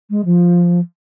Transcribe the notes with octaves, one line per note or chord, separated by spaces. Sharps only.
G#3
F3